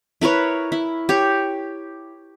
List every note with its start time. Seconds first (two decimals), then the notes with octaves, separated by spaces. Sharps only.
0.21 E4 A#4 B4 C#5
0.72 E4
1.09 G4 C#5